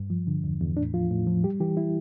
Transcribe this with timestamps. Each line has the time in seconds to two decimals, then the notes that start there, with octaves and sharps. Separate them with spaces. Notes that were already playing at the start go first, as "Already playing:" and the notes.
Already playing: G2
0.10 F3
0.27 D3
0.44 E2
0.61 E2
0.77 A2 D4
0.94 F3 F4
1.10 A2
1.27 F3
1.44 G3 G4
1.60 E3 G4
1.77 E4